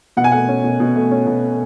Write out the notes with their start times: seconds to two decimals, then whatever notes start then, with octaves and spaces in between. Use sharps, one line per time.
0.17 B2 F#5
0.24 G#5
0.32 A3 F#5
0.48 C#4
0.64 B2
0.80 B2
0.96 A3
1.11 C#4
1.27 B2